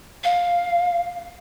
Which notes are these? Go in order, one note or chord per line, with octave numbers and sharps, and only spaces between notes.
F5